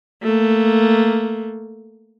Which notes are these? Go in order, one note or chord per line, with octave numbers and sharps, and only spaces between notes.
A3 A#3